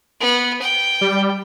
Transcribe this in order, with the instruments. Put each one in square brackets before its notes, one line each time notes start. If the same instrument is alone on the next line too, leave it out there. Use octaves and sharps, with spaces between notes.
[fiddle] B3
G5
[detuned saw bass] G3